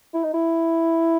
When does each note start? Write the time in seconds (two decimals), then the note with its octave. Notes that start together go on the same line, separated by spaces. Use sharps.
0.13 E4
0.24 D#4
0.34 E4